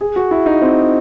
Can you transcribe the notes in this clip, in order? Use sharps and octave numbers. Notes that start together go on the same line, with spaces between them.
G#4
F#4
E4
D#4
C4